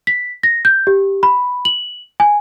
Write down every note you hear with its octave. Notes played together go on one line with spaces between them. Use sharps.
B6
A#6
G6
G4
B5
F#7
G#5